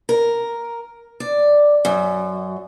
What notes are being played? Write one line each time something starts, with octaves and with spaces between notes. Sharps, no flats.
A#4
D5
F#2